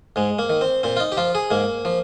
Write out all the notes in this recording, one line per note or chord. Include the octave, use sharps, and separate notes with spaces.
G#2 G#3
A#3
D#3
C4
A#2 C4
F4
D#4
G4
F3 F4
G#4
G#2 A#3
F3